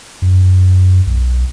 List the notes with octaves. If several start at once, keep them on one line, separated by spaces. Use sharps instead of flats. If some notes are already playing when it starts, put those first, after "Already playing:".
F#2
B1